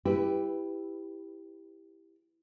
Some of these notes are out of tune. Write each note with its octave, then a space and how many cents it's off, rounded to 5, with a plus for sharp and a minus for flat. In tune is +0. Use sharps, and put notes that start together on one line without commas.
E4 +0 G4 +10 B4 +20